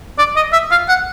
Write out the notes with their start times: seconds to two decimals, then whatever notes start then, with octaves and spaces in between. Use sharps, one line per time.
0.19 D5
0.36 D#5
0.53 E5
0.71 F5
0.89 F#5